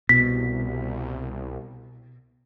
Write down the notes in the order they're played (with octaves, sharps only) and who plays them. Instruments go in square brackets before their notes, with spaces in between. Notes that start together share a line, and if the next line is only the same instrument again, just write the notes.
[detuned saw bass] C2 [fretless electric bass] B2 [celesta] B6